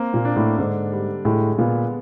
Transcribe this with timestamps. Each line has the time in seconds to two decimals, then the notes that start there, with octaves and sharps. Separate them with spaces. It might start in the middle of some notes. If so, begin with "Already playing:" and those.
Already playing: A#3 C4
0.14 A#2
0.25 D4
0.36 A2
0.58 G#2 D3
0.92 G3
1.25 A2 G#3
1.58 A#2 B3